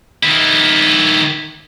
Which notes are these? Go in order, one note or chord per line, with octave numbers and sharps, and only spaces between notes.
D#3 E4